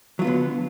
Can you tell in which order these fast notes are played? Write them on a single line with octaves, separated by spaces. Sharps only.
F#3 F4 B3 D3